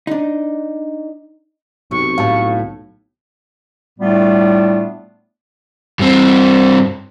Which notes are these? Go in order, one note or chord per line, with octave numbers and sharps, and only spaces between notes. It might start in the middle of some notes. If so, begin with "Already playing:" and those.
D4 D#4
B1 C3 C#6
A2 F5 A5
A2 G3 A3 B3 D4 F4
G2 C4